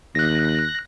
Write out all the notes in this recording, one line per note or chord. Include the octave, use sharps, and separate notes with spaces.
D#2 F#6 A#6